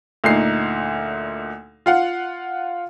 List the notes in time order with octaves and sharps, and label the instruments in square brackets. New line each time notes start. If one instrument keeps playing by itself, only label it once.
[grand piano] D2 A#2 D#4 C7
F4 F5 F#5